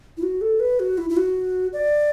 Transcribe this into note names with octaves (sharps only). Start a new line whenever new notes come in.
E4
F#4
A4
B4
F#4
E4
E4
F#4
D5